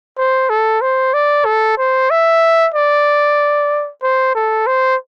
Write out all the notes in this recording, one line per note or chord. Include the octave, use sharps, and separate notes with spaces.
C5
A4
C5
D5
A4
C5
E5
D5
C5
A4
C5